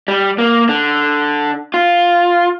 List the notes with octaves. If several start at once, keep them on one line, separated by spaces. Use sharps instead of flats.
G3
A#3
D3
F4